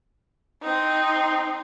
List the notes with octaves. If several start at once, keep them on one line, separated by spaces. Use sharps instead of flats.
C4 D#4